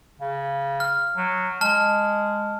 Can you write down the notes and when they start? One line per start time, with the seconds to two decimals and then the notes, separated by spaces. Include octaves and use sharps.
0.20 C#3
0.80 F6
1.17 F#3
1.61 G#3 A5 F6